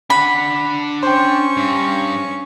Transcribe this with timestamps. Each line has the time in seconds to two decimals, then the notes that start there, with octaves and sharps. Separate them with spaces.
0.10 D4 F#5 B5
1.03 C#4 C5 G5 C#6
1.57 G2